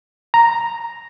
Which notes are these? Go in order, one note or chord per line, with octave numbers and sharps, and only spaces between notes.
A#5